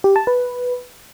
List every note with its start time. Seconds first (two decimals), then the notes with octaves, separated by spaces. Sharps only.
0.04 G4
0.16 A5
0.27 B4